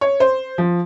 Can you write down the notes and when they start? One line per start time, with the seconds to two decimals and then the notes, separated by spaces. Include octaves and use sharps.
0.01 C#5
0.20 C5
0.58 F3